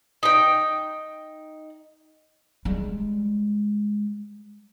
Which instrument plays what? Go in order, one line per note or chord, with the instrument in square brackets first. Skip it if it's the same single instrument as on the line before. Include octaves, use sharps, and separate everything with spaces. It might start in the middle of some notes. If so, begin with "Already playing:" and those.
[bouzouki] D#4 G5
[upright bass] G3 G#3